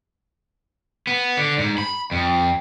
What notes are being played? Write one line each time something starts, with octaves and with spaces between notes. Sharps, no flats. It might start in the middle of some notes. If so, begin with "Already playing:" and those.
B3
D3
G#2
B5
F2